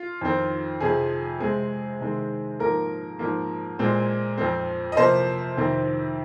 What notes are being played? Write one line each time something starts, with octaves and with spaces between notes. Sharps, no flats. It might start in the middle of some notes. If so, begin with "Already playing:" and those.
Already playing: F4
F2 D#3 C4
F2 C3 F3 G#4
C3 G#3 C4 G#4
C3 D#3 G#3 C4
G#2 F3 A#3 A#4
G#2 F3 A#3
A#2 G#3 C4
F2 F3 C4
D#5
C3 F3 A#3 C5
F2 C3 D#3 C4